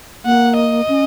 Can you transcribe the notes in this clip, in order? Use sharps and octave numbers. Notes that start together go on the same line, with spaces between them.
A#3 F#5
D#5
C#4